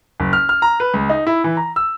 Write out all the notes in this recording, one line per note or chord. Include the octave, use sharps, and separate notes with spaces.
F#1
F6
F6
A#5
B4
C#2
D#4
E4
E3
A#5
E6